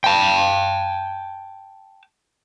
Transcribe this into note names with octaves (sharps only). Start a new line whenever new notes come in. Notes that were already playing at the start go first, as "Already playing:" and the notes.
G5 A5